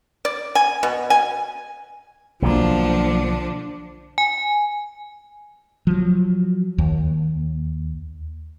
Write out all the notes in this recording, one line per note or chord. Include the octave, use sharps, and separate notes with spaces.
D5
G#5
B2
G#5
B1 D3 F3 A#3 D4
G#5
F3 F#3
D#2